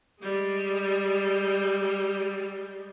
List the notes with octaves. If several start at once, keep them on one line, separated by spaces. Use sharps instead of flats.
G3 G#3